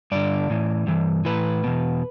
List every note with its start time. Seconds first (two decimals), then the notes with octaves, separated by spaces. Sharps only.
0.12 G2 D3 D5
0.50 A2 E3
0.87 G2 E3
1.25 A2 E3 B4
1.64 E2 B2